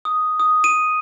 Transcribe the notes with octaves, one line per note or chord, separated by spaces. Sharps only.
D#6
D#6
D#7